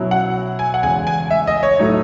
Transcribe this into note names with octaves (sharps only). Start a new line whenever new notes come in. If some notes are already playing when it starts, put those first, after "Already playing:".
Already playing: B2 F#3 C#4 E4
F#5
G#5
F#5
E2 C#3 G#3 G#5
G#5
E5
D#5
C#5
A2 F#3 A3 D#4